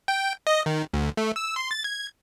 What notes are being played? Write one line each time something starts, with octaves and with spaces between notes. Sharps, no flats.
G5
D#5
D#3
D2
A3
E6
C6
A6
G#6